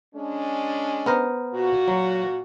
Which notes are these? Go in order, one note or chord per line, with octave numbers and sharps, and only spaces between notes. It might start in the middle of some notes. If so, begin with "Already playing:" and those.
G#3 C#4 D4
B3 A#4 C5
A#2 F#4
F#3